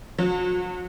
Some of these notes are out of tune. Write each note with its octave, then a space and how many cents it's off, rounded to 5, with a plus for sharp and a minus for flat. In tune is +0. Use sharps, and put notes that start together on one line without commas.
F#3 -35